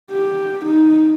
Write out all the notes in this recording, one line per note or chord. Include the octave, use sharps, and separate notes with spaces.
G4
D#4